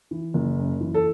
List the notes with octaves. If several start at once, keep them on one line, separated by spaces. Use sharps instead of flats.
E3
F#1
F#2
E3
A4